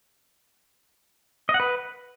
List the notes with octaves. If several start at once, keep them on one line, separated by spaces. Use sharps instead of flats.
D#5
F#5
B4